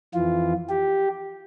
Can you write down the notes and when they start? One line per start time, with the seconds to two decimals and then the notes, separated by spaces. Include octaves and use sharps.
0.14 F2 E3 F4
0.69 G4